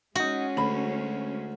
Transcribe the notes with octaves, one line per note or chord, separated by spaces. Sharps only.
G#3 C#4 D#4 F#4 F#5
D2 B5